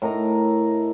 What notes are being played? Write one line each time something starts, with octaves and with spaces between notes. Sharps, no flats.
A2 A#4 D#5 A#5